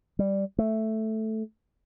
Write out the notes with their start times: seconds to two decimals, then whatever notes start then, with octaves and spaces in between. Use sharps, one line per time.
0.19 G3
0.59 A3